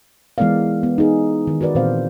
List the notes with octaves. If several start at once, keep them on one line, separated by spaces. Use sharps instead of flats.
E3 G#3 B3 A#4 D5 F5
B3
D#4 G#4
D#3
F#4 A#4 B4 D5
A#2 E3 C4 C5 F5